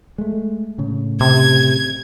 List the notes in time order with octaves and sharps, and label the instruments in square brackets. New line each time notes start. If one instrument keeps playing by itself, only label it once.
[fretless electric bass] G#3 A3
A2 C#3
[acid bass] C3 [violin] G#6